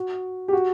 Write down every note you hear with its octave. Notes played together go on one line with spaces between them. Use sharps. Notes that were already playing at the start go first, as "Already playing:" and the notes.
Already playing: F#4
G4
F#4